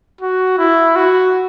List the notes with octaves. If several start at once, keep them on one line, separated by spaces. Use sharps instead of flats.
F#4
E4
F#4